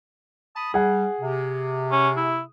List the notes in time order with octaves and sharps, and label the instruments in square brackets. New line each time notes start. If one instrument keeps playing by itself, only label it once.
[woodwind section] A5 B5 D#6
[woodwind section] G3 [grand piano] G#4 F#5
[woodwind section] C3
[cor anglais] C#4
E4